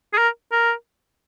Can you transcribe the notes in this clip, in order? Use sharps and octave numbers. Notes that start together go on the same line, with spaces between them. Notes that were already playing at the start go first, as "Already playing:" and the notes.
G#4
A#4
A#4